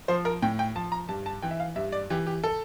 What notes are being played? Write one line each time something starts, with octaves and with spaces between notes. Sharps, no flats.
F3 C5
A#4
A2 G5
G5
F3 A5
A#5
G2 A5
A5
E3 G5
E5
F5
G2 E5
D5
E3 G4
G4
A4